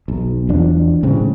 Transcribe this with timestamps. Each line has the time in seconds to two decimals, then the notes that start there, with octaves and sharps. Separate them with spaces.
0.08 B1
0.49 E2 F3 D4
1.03 A2 C#3 G#3 C4